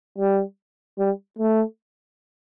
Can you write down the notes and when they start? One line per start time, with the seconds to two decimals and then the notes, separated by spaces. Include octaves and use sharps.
0.18 G3
0.98 G3
1.39 A3